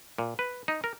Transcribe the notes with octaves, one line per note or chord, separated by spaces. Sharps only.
A#2
B4
D#4
A#4